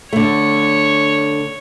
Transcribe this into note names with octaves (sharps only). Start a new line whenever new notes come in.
D3 A3 C#5